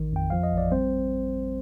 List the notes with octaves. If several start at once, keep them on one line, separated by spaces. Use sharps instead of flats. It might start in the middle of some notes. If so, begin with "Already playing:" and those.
Already playing: A1 D#3
F2 G5
F3 F5
D#5
A1
D5
G3 C4 C5